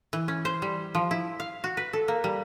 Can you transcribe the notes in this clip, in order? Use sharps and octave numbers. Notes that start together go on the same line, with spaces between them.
E3
C#4
C5
G3
F3
E4
F5
F#4
B4
A4
A#3
G3